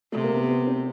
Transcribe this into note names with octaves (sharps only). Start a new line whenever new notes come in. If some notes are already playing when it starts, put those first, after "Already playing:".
C3 A3
A#3
B3
B3
C4